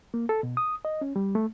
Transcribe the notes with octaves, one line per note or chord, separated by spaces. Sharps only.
A#3
A4
B2
D#6
D#5
C#4
G3
A3